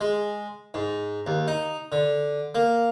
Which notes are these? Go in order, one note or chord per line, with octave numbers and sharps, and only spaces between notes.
G#3
G#2
D#2
D#4
D3
A#3